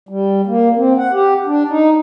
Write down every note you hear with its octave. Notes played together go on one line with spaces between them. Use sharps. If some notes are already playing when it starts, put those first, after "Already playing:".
G3
A#3
C4
F#5
G4
D4
D#4